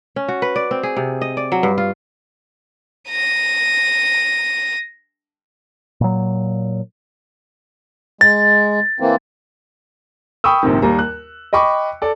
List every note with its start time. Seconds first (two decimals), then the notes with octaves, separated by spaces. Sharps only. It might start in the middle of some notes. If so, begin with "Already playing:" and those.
0.16 C#4
0.28 F#4
0.42 B4
0.56 D5
0.71 C4
0.83 G#4
0.97 C3
1.21 D#5
1.37 D5
1.52 F#3
1.63 G2
1.78 F4
3.10 A#6 D#7
6.01 A#2 F#3
8.21 G#3 A6
9.00 E3 A#3 C4
10.44 G5 B5 C#6 D#6 E6
10.63 A#1 G#2 C3 D#3
10.82 D#2 G3 A#3 A#5
10.99 F#6
11.53 D#5 G5 B5 C#6 D6
12.02 A4 D5